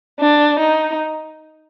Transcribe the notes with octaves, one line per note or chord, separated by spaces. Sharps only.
D4
D#4